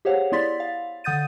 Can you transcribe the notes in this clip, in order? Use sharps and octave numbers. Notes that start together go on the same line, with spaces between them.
G4 G#4 C5 C#5 F5 F#5
B3 E4 D5 C6 A6 B6
F5
D3 F#5 D#6 G6 A6 D#7